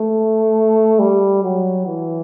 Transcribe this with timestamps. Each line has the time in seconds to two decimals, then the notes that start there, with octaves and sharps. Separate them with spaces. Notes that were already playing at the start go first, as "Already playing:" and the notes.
Already playing: A3
0.99 G3
1.43 F#3
1.86 E3